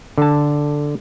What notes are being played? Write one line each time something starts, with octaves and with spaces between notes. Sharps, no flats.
D3 A5